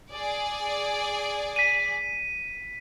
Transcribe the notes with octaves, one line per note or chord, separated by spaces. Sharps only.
G#4 D5
B6 D#7